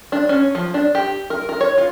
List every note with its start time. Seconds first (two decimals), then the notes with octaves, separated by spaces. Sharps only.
0.12 D4
0.29 C#4
0.55 F3
0.74 D4
0.95 G4
1.30 A#4
1.49 A#4
1.61 C#5
1.78 F4